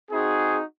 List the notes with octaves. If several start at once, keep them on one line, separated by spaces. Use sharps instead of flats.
C4 D#4 F#4 G#4